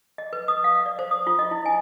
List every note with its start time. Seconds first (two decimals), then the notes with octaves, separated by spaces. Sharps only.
0.18 D#5
0.33 B4
0.48 D#6
0.64 F5
0.86 D5
0.99 C5
1.11 D#6
1.27 F4
1.39 D#5
1.51 E4
1.66 G#5